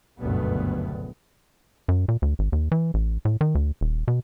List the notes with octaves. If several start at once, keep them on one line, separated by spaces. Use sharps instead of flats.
F#1 D2 G2 B2 B3
F#2
A#2
D2
G#1
D#2
E3
A1
A2
D#3
D2
D#1
B2